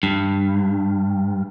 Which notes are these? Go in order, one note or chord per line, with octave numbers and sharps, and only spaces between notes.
G2